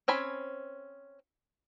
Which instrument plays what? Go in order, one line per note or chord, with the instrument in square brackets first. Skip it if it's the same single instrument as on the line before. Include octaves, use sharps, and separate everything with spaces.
[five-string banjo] C4 C#4 G#5 B5